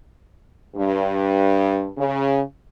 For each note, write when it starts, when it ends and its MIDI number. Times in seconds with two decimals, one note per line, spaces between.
0.76 1.90 43
1.98 2.42 49